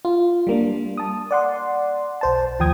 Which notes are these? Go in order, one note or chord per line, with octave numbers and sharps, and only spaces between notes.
F4
G3 A#3 D4
A5 D#6
D5 F#5 C6
B1 C5 A5
D#2 F3 G5 D#6 G#6